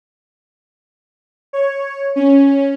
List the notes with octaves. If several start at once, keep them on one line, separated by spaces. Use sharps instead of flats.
C#5
C#4